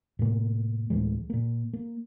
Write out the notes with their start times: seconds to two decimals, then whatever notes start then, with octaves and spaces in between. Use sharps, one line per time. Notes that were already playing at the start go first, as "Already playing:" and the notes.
0.19 A2 C3 A#3
0.90 D2 A2 E3 G#3
1.30 A#2 A#3
1.73 A#3